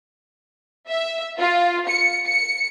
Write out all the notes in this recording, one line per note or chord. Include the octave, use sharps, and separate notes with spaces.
E5
F4
C#7
C#7